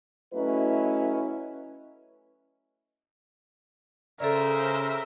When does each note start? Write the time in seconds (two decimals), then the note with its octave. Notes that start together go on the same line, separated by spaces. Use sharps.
0.34 F#3 A3 C#4 E4 B4 D#5
4.20 C#3 A4 A#4 C5 D5 E5